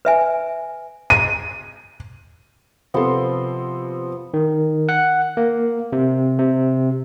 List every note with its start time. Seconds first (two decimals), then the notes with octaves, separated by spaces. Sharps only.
0.05 B4 E5 G#5
1.10 D#7
2.94 C3 F3 B3 A4 C6
4.34 D#3
4.89 F#5
5.37 A#3
5.92 C3
6.39 C3